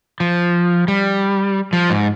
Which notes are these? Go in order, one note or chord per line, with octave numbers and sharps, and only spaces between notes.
F3
G3
F3
G#2